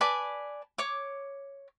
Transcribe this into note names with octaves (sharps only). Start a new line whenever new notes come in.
B4 D5 G#5 A5
C#5 D6